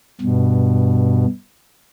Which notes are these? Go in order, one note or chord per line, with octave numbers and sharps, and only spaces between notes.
G2 B2